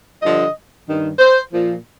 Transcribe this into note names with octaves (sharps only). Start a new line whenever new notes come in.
G2 D3 F3 D#5
G2 D#3
C5
A#2 F3